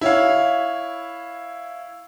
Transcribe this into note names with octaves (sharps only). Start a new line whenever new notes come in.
E4 C#5 F5